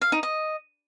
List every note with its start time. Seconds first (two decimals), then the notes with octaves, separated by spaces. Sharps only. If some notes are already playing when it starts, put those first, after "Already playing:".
0.01 F5
0.12 D#4
0.23 D#5